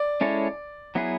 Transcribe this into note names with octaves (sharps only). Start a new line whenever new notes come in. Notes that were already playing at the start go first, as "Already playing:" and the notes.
Already playing: D5
G#3 C#4 E4 A4 C#5
F#3 B3 E4 G#4 B4